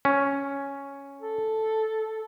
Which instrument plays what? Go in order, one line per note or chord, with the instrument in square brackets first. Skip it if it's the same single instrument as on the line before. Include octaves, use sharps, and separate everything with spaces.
[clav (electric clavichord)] C#4
[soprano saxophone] A4